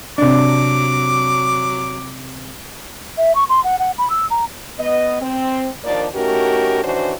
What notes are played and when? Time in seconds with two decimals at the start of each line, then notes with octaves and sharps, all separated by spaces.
0.18 C3 F#3 D4 D6
3.17 E5
3.35 C#6
3.49 C6
3.64 F#5
3.79 F#5
3.98 B5
4.10 E6
4.30 A#5
4.79 B3 D#5
5.20 C4
5.84 D#2 F3 A#3 D4 D5
6.14 A3 C#4 D#4 F#4 G4 A#4
6.83 D#3 E3 C#4 D4 F#4 C5